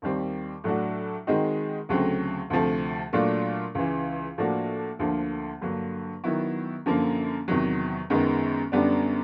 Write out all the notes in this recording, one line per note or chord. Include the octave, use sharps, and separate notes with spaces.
D#2 D#3 G3 C4
A2 F#3 A3 D4 F#4
D#3 G#3 C4 D#4 F#4
D2 C#3 F#3 A3 C4
D2 C3 F3 A3
A#2 F#3 A3 D4 F4
C#2 C#3 E3
A2 F3 A#3 D4 F#4
D2 D3 F3 A#3
G2 D3 F#3 A#3
D#3 F#3 B3 E4
F#2 D3 F3 A#3
E2 C3 D#3 F#3
F#2 D#3 G#3 B3
F#2 D3 G3 B3 D4